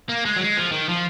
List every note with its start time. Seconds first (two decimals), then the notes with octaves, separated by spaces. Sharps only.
0.09 A#3
0.25 G#3
0.37 F#3
0.41 G#3
0.57 F3
0.72 D#3
0.89 F3